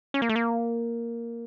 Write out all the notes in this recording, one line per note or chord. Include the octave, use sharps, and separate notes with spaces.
C#4
A#3
A3
A#3